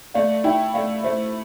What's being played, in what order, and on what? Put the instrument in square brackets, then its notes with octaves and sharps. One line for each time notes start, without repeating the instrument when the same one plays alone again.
[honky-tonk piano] A3 [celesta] D5 F5
[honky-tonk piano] E4 [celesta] E5 G5
[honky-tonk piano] A3 [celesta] D5 F5
[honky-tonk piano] A3 [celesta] C5 E5